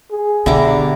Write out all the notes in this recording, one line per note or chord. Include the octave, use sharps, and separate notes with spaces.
G#4
B2 D3 G3 E4 A#5 D6